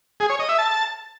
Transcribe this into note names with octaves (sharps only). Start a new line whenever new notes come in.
G#4
C#5
D#5
E5
A5